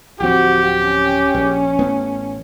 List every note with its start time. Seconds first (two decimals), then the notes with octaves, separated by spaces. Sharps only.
0.20 D1 F3 C4 F#4 G4
0.84 C#4
1.34 A#1
1.79 A1 A3 B3